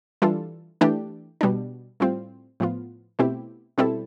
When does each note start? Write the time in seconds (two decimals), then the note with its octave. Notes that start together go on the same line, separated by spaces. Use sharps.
0.22 E3 G3 D4 F4 A4
0.81 E3 A3 D4 G4
1.41 B2 G3 D4
2.00 A2 G3 C4 F4
2.60 A2 F3 B3 F4
3.19 B2 A3 C4 E4 G4
3.78 B2 G3 C4 E4 A4